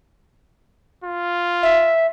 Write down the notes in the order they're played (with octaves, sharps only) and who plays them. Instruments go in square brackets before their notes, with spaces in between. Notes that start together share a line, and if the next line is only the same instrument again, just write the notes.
[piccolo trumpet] F4
[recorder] E5